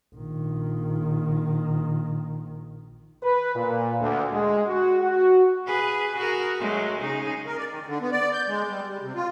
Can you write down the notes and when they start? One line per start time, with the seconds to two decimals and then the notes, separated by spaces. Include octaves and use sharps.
0.16 A#1 D#3
3.23 B4
3.56 A#2
4.00 D2
4.33 G#3
4.67 F#4
5.02 F#4
5.66 G#4 B4
6.16 F#4 G#4 A#4
6.59 F#3 G#3 A3
7.00 C#3 D#4 G#4
7.46 A#4
7.57 D5
7.69 D#3
7.87 D3
8.01 B3
8.12 D5
8.33 G6
8.47 G#3
8.69 G3
8.87 G3
9.02 C3
9.15 F4